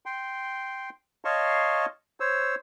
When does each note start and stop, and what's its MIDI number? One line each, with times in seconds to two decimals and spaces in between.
0.06 0.90 79
0.06 0.90 84
1.25 1.86 73
1.25 1.86 75
1.25 1.86 77
1.25 1.86 81
1.25 1.86 84
1.25 1.86 85
2.20 2.55 72
2.20 2.55 73
2.20 2.55 88